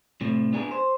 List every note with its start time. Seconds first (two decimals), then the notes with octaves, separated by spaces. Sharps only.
0.21 A2 C3 A3
0.53 B3 D4 G#4 A#4
0.71 C5